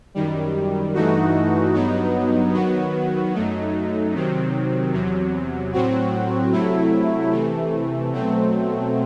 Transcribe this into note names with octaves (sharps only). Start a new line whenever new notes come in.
F#2 D#3 G3
G2 E3 A3 D#4 F#4
G2 F#3 B3 D#4
D#3 F#3 B3 F#4
F#2 F#3 A3 D#4
C3 D#3 F#3 C4
E2 C3 F#3
A2 F#3 C4 F#4
C3 F#3 A3 E4
C3 E3 A3
B2 F#3 A3 C4